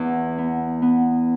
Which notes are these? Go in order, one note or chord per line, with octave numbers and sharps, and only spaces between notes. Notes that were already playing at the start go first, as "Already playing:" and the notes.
Already playing: E2
B3
B3